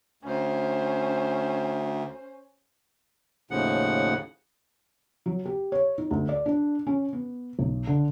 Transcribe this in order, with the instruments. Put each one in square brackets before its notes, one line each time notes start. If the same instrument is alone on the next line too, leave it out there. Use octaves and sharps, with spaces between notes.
[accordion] D2 [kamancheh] C#4 C5
[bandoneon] D#2 A2 C#3 F3 F#5
[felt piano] F#3
G4
C#5
D#4
D2
D5
D4
C#4
B3
B1
D3